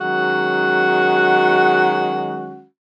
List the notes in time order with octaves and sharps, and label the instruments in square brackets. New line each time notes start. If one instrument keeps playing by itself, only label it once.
[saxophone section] D#3 F#3 G#3 C#4 F#4 F#5